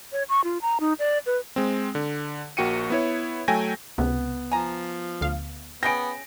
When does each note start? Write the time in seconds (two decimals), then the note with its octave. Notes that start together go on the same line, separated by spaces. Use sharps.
0.12 C#5
0.29 C#6
0.44 F4
0.62 A#5
0.80 D#4
0.99 D5
1.26 B4
1.56 G#3 C4
1.95 D3
2.57 A#1 A#3 F#4 G5 C#7 D#7
2.90 B3 E4 C#5
3.48 F#3 A3 G5 G#5 A#6
3.98 C#2 C3 B3
4.51 F3 G#5 A#5
5.21 D2 F5
5.83 B3 C#4 G#4 G5 A#6 D7